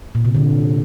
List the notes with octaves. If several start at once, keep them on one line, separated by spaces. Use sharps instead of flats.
A#2
C3
D3